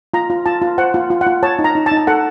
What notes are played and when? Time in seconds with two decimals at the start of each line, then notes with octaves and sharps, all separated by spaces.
0.14 F4 A#5
0.30 F4
0.46 F4 A5
0.62 F4
0.78 C5 F#5
0.94 F4
1.10 F4
1.21 F#5
1.27 F4
1.43 C#5 A5
1.59 D#4
1.64 A#5
1.75 D#4
1.86 A5
1.92 D#4
1.97 A5
2.07 A4 F#5